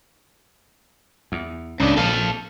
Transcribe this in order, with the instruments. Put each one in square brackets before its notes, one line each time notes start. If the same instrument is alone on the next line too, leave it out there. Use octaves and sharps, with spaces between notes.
[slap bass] E2
[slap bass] C#2 A2 [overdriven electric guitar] C#3 D4
[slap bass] A#1 [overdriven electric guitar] A4 F5